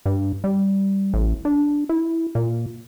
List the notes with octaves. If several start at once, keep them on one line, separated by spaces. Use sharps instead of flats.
G2
G3
A1
D4
E4
A#2